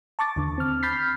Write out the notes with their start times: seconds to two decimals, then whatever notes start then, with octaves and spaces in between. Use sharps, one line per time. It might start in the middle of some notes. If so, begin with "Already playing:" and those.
0.19 A5 C#6 D6 A6
0.36 D#2 D3
0.58 C4 F6
0.83 B5 F6 G6 A6 B6 C7